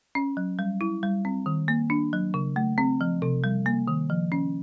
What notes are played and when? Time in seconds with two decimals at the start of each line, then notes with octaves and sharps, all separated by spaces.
0.15 C#4
0.37 F#3
0.59 G3
0.81 E4
1.03 G3
1.25 C4
1.46 D#3
1.68 A#3
1.90 D4
2.13 F#3
2.34 C#3
2.56 A3
2.78 C4
3.01 F3
3.22 C3
3.44 G3
3.66 A#3
3.88 D#3
4.10 F3
4.32 C#4